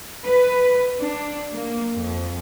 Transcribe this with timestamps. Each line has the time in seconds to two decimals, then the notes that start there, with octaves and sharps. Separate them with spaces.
0.24 B4
1.00 D4
1.52 A#3
1.95 F2